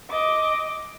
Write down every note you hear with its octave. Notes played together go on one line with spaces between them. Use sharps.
D#5 D6